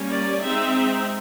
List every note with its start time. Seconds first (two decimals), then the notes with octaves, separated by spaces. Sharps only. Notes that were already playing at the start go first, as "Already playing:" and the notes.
Already playing: G3 A#3 C#4
0.11 D5
0.42 G#3 C4 D#4 E5